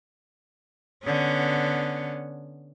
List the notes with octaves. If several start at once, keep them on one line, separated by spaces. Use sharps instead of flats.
D3 B3 C#4